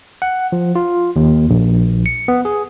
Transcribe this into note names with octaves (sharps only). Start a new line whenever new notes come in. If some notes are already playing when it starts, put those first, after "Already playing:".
F#5
F3
F4
D#2
A#1
C#7
B3
G#4